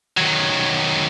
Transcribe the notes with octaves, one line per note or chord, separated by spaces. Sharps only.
D#3 F#3